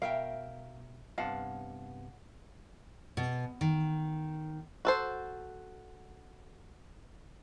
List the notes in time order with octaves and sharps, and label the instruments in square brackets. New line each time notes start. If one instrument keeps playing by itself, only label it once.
[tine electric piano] B2 [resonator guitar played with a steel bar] A#4 E5 G5 [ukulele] F5
[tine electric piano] G2 C3 B3 [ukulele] F5 F#5 A5
[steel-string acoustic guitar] B2
D#3
[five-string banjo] F#4 A4 C5